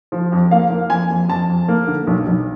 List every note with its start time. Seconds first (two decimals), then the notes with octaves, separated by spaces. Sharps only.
0.12 F3
0.32 F2
0.51 A#3 F5
0.70 A#3
0.90 F2 G#5
1.10 F2
1.29 F2 A5
1.48 F2
1.68 A#3
1.87 D3
2.07 B1
2.27 B1